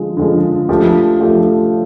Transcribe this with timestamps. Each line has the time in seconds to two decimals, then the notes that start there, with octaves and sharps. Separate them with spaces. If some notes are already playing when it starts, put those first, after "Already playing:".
Already playing: D3 F3 G#3
0.17 D3 F3 G#3
0.69 F3 A3 D4 G4
1.21 F3 A3 D4 G4